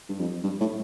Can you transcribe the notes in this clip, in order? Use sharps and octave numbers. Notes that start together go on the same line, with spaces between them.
G2
F2
G2
A2